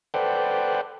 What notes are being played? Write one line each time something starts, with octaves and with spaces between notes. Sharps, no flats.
A4 B4 C5 D5 F#5 G5